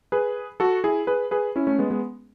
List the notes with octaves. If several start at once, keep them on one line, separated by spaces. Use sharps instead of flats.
G#4 B4
F#4 A4
E4 G#4
G#4 B4
G#4 B4
C#4 E4
A3 C#4
G#3 B3
G#3 B3